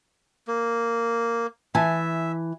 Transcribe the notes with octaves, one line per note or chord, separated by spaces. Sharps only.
A#3
E3 E5 G#5 A5